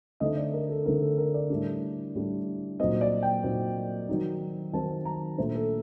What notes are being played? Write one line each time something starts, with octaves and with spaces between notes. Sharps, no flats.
D3 A3 C4 D#4 D#5
D5
A#4
A4
D3 A3 C4 D#4 A#4
A4
A#4
D5
A2 G3 D4
A2 G3 D4
A#2 F#3 C4 D#4 D#5
D5
G5
A#2 F#3 C4 D#4
D#3 F#3 C4 D#4
D#3 F#3 C4 D#4 A5
A#5
A#2 A3 D4 C5
A4